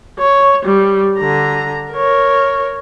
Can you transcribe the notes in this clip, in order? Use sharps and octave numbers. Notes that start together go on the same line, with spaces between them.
C#5
G3
D3 A#5
A#4 C#5